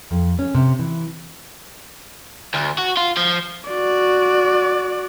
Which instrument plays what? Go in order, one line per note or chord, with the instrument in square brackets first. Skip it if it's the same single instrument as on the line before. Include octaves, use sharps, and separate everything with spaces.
[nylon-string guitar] F2
C#4
C3
E3
[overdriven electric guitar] D2
F#4
F4
F3
[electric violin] F#4 D5